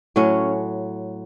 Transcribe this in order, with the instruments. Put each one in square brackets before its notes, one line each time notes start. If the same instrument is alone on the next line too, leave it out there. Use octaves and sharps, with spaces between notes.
[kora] A2 F#3 C#4